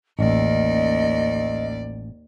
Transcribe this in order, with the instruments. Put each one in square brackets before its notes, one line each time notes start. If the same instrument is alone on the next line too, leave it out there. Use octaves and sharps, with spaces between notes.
[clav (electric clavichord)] A1 [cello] D#2 D5 [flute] D#5